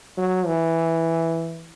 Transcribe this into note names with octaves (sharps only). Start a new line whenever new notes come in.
F#3
E3